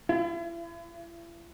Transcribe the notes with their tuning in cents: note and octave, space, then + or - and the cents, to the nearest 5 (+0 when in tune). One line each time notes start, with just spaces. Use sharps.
E4 +40